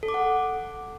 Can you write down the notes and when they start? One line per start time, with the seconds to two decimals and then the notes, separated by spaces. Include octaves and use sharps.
0.03 A4
0.08 D6
0.14 F#5